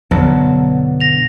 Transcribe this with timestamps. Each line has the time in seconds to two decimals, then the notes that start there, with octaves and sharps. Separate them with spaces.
0.11 B1 G2 B2 D3 F#3 A5
1.00 A#6 F7